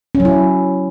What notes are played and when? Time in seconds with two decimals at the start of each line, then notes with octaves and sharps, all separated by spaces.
0.15 C#4
0.20 F#3
0.25 E4